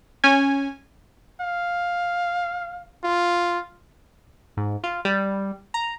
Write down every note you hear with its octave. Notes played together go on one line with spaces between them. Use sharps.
C#4 G#5
F5
F4
G#2
F4
G3
A#5